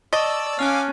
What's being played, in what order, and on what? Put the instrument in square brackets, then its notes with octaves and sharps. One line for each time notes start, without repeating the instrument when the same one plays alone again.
[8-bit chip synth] D5 E6 [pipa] D#5 [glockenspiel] A5 C#6 A6
[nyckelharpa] C#4 [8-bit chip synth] F5 G#5 D6 [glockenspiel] F6 F#6